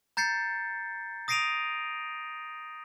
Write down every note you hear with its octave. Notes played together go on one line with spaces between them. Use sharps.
A#5 G6 A6 C7 C#7
D#6 A#6 C7 D7 D#7 F7